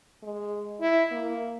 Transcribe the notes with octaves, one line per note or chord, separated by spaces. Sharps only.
G#3
E4
A#3